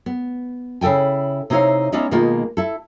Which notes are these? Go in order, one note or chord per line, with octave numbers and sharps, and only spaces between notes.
B3
C#3 E4 A4 G5 G#5
C3 D#4 E4 G4 C#5 F5
G#3 B3 C#4 D#4 E4 D5
B2 D#3 G#3 A#3 D#4 F4
E4 A4